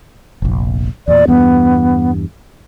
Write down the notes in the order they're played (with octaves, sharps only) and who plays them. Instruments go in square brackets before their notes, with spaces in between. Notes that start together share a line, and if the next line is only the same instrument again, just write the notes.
[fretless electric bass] F1 A#1
[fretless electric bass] E2 A#2 [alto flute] D5
[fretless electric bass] E2 G2 [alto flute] B3